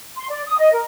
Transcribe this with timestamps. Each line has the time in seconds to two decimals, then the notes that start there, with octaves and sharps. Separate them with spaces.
0.16 C6
0.29 D5
0.46 D#6
0.58 D#5
0.72 A#4